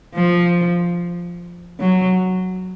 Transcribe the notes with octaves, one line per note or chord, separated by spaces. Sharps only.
F3
F#3